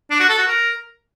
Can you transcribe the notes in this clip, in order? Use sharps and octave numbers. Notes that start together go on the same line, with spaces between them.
D4
F#4
A4
F#4
A#4